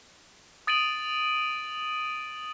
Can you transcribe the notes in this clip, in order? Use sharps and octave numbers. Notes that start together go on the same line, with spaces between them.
D#6 A6 D7 D#7 F#7